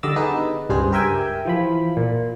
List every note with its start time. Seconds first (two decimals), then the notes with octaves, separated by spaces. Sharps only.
0.03 D3 G3 D5 D#5 E6 A6
0.16 B3 D#4 G#4 B4
0.69 C#2 G2 G3 D4 G#4 C5
0.92 G4 A#4 E5 G5 G#5
1.45 E3 F3 B5
1.97 A#2